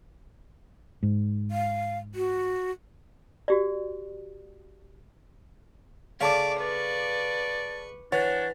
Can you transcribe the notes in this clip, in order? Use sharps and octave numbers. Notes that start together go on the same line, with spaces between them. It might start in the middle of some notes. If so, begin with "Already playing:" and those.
G#2
F5
F#4
F#4 G4 D5
C#3 A3 C#5 D5 F5 A5 D6
B4 D5 C#6
E3 D4 C#5 F#5 A6